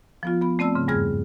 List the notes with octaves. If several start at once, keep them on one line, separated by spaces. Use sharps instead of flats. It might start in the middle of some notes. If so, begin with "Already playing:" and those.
F3 B3 F4
B3 B5
A3 C4 D5 A5 E6
G#2 C#3
E2 G2 G3 G#4 F6 G#6